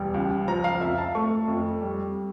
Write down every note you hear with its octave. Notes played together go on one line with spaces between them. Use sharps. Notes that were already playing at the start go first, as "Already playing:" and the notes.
Already playing: E1 G3
C#2
F3 A#5
F5
F2 E5
A5
A3 C#6
F2
G3